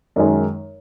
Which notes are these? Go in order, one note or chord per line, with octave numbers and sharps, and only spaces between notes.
F#2 D#3 G#3